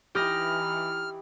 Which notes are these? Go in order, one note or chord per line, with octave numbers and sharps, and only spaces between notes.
E3 D#4 G4 D#6 F6 A#6